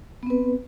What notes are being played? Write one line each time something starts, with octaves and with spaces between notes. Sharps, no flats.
B3 C4 B4